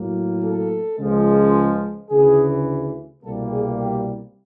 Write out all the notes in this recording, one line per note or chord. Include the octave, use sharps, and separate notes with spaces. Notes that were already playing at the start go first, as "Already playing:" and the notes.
Already playing: A2 F#3 A#3
A4
C#2 C#3 F3 G#3
D2 C#3 E3 G#4
C2 B2 G3 A#3 A4
G#4
G4